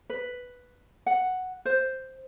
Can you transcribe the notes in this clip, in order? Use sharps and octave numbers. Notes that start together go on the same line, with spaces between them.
B4
F#5
C5